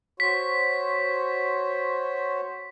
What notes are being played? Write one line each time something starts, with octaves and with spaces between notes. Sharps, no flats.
F#4 C5 C#5 B6